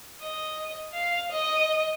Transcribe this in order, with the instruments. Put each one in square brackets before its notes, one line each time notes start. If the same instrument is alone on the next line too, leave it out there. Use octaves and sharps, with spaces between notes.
[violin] D#5
F5
D#5